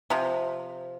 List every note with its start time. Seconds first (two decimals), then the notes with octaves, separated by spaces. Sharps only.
0.10 C3 F3